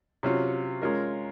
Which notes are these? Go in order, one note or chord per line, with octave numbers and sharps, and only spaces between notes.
C3 F#3 C#4 F4
G#3 C#4 F4 A#4